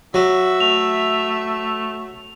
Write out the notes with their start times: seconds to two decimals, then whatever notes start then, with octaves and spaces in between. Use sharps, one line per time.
0.14 F#3 F#4 E5
0.60 A3 F7